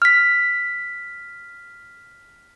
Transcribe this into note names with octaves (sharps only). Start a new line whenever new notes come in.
F6 B6